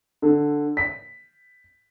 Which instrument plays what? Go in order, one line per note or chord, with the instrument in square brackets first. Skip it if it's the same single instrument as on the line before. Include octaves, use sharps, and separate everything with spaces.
[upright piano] D3
B6